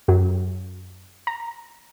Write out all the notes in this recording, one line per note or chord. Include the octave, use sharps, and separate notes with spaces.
F#2 F#3
A#5